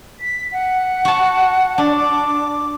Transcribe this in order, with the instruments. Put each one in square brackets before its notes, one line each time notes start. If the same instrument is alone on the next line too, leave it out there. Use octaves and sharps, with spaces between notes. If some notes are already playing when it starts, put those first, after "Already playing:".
[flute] B6
F#5
[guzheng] F#4 A5
[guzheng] D4 [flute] D5
[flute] D6